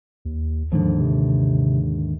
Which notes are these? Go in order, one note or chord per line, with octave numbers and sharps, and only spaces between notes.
D#2
D#2 G#2 D3 F3
C3